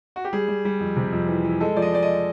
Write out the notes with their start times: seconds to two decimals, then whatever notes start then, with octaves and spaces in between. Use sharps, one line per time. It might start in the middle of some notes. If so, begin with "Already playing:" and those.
0.16 F#4
0.25 G4
0.33 G3 G#4
0.48 G3
0.65 G3
0.80 F2
0.96 C3
1.12 F2
1.28 E3
1.45 E3
1.60 G#3 A4
1.76 F3 D5
1.82 D#5
1.93 G#3 D5
2.02 D#5